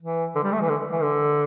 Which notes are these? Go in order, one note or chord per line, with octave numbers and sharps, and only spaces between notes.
E3
D3
G3
A3
E3
D3
E3
D3